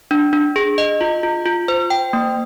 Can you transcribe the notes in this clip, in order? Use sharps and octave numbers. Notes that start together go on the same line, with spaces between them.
D4
D4
G#4
D#5
F4
F4
F4
C5
G5
A#3